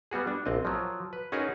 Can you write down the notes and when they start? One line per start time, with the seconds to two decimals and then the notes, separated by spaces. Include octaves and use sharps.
0.11 G3 B3 F#4 G#4
0.27 D4
0.46 A#1 C4 D#5
0.65 F3 F#3
1.13 B4
1.32 C#4 D#4 F#4 G#4 A#4 B4